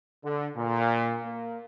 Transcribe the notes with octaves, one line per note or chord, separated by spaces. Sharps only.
D3
A#2
A#3